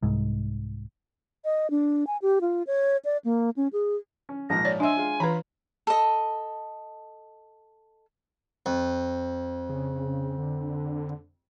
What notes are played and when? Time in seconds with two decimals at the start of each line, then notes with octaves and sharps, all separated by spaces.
0.03 C2 G#2
1.45 D#5
1.70 D4
2.07 G#5
2.22 G4
2.41 F4
2.67 C#5
3.05 D5
3.25 A#3
3.57 C#4
3.73 G#4
4.29 C#4
4.50 A#1 G#2 F3 A#6
4.65 C#5 D5
4.80 D4 D#5 E5 G#5 C6 E6
4.97 G#3 F4
5.20 E3 F4 B4 A#5 B5
5.87 A4 D#5
8.66 F2
9.70 C#3
10.38 D3